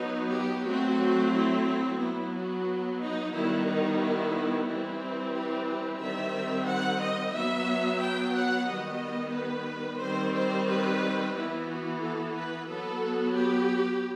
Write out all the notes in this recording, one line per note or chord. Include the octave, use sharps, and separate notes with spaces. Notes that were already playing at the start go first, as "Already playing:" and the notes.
Already playing: F#3 B3 D#4
G4
F#3 A3 C4 F#4
E4
F#3 B3 E4
F#4
D#4
D#3 G3 B3 E4
D#4
E4
E3 G3 C4 E4
G4
G4
D#3 G3 C4 E5
F#5
D#5
F#3 B3 E5
G5
F#5
D#3 G3 B3 D#5
B4
D#3 G3 C4 C5
C5
B4
E3 B3 E4
F#4
A4
B4
F#3 B3 A4
G4